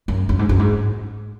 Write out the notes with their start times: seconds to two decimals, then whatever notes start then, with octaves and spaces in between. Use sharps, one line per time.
0.08 F#2
0.29 F#2
0.39 G#2
0.49 F#2
0.59 G#2